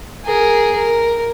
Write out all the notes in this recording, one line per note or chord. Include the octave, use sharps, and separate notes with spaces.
G#4 A#4
A#4